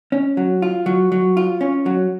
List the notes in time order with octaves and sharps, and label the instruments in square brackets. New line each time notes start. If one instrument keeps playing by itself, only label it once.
[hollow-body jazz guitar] C#4
F#3
F4
F#3
F#3
F4
C#4
F#3